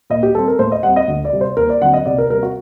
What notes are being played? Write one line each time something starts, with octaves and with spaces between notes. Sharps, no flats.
A#2 D#5
G4
G3 C4 A4
A#4
A2 C5
D#5
G3 C4 F#5
D#5
D2
D5
C3 G3 C4
C5
D#2 A#4
D5
D3 F#3 C4 F#5
D#5
C2 D5
A#4
C3 G3 C4 A#4
F#4